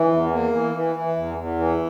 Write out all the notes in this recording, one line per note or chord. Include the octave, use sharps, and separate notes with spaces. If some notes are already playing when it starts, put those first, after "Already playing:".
Already playing: E3
E2
A#3
E3
E3
E3
E2
E2
E3